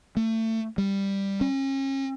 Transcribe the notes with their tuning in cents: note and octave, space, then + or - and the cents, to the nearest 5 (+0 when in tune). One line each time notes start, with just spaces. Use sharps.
A3 +25
G3 +5
C#4 -40